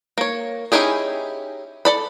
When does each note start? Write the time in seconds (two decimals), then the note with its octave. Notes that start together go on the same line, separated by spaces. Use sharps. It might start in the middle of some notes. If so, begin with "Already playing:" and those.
0.18 A#3 C#5
0.72 C#4 D#4 E4 G4 G#4
1.85 A4 D5 B5